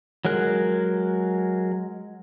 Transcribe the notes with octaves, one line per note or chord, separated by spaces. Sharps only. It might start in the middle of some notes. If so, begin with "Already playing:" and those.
F#3 G#3 A#4 F#6